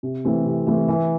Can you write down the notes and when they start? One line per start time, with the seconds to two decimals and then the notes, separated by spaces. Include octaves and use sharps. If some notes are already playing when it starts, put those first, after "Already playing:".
0.03 C3
0.25 E3 A3 C4
0.46 C3
0.67 E3 A3 C4
0.88 E3